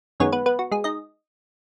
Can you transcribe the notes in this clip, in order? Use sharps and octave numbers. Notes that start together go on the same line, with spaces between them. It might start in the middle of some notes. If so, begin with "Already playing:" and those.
F#2 D#3 G#3 B3 C#4 C#5
B3 B4
B3 B4
F#4
G#3 G#4
D#4 D#5